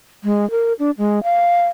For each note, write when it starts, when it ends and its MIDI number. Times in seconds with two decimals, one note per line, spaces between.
0.24 0.49 56
0.51 0.73 70
0.79 0.91 62
0.98 1.20 56
1.23 1.66 77